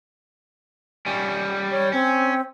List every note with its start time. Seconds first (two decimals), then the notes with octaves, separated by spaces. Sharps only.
1.06 G3 C#4
1.71 C#5
1.93 C4 C#4